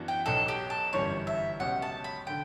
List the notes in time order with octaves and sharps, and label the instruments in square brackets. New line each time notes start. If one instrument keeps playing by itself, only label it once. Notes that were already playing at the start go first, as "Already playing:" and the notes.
Already playing: [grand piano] F#2 E3 B3 D4 F#4
[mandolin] G5
[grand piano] B1 B2 F#3 [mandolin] A4
[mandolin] G4
A4
[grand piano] G1 F#2 E3 G3 C#4 [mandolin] C#5
[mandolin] E5
[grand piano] C#2 B2 F#3 C#4 G4 [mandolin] F#5
[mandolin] A5
B5
[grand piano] D3 [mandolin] G5